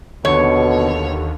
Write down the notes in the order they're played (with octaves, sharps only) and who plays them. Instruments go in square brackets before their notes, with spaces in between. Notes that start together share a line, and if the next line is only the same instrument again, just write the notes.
[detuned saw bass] D#2 [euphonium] B2 [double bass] D3 [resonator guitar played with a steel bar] C#5